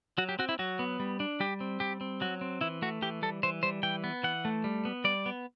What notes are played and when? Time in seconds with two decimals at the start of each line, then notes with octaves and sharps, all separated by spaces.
0.18 F#3 F#4
0.29 G4
0.39 C4 F#4
0.49 E4
0.59 F#3 F#4
0.79 B3
1.00 G3
1.20 D4
1.40 G3 G4
1.60 C4
1.80 G3 G4
2.01 C4
2.21 F#3 F#4
2.41 C4
2.61 E3 E4
2.82 A3 F#4
3.02 E3 G4
3.22 G3 A4
3.43 E3 C5
3.63 G3 C5
3.83 E3 G5
4.04 B3
4.23 E3 F#5
4.45 A3
4.64 G3
4.85 B3
5.04 G3 D5
5.26 B3